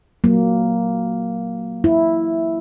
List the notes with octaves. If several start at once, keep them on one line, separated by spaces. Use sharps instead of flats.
F#3 A#3
E4